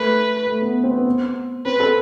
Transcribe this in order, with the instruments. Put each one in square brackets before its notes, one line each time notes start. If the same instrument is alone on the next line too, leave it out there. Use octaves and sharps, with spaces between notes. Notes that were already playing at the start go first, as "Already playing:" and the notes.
Already playing: [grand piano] A3 [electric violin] B4
[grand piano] A3
B3
C4
B3
C4
[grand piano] C4 [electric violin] B4
[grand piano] A4